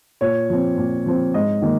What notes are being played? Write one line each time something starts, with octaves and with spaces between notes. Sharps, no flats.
A#2 C#5
F3 C4
A#2
F3 C4
G#2 D#5
D#3 A#3